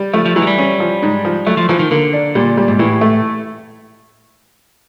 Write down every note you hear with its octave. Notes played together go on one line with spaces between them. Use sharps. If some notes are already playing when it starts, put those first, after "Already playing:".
Already playing: G3
F3 A3
F3
E3 F#3
G#3
G3
C#4
F3
G#2
F3
F#3 A3
F3
E3 F3
D#3
D3 A#3
D4
A#2 G3
G3
G#2
A2 E3
A3